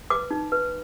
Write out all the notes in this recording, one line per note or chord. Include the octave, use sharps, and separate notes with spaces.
B4 D6
D#4
B4